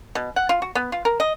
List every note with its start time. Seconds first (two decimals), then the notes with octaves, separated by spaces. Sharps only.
0.15 B2
0.36 F#5
0.49 F4
0.62 F#4
0.75 B3
0.92 F4
1.05 A#4
1.20 D#5